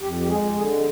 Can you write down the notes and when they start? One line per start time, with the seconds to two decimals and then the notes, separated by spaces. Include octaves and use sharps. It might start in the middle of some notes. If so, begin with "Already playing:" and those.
0.01 F2 G4
0.20 G4
0.28 G#3 G#4
0.55 D3 G#4